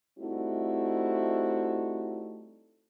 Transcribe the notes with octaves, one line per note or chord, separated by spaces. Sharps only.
G3 A3 C4 D#4 E4 F#4